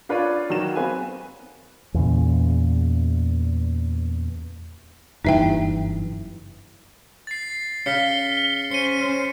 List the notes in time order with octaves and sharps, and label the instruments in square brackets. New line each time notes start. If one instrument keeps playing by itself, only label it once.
[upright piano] D4 F4 B4 C#5 D5
D#3 F#3 F#4 E7
B3 C4 B4 F5 G#5
[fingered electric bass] E2 A#2 C#3
[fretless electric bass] F#1 G2 E3 [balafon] D#4 E5 G5
[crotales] A6 C7
[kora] C#3 [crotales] F6 B6 C#7 [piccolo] G7
[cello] C#4 C5 [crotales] C#7 D#7